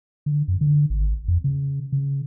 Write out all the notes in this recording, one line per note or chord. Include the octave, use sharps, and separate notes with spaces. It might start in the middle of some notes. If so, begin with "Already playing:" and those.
D3
F#2
D3
G#1
F2
C#3
C#3